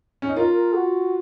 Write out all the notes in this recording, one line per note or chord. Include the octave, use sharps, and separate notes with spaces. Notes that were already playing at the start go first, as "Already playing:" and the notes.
C#4
D#4
F4 A#4
A#4
F#4